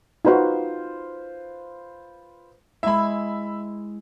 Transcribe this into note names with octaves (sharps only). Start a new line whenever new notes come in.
D#4 F4 F#4 B4 C5
G#3 E4 E5 B5